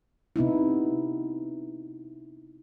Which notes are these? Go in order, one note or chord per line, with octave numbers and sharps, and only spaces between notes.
C3 B3 D#4 E4